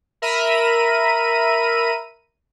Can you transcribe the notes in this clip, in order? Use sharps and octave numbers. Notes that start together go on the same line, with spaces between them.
A#4 E5 A#5 B5 D#7